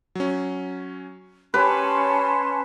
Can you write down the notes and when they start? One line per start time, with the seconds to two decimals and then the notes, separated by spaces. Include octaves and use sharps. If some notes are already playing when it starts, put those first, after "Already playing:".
0.15 F#3 C#4
1.54 C#4 G4 B4 A5 C6